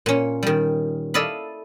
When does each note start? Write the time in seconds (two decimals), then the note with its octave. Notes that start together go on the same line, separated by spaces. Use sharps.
0.06 A#2 C#4
0.43 D#3 G3
1.14 E4 A4 D5 D#5 F5 B5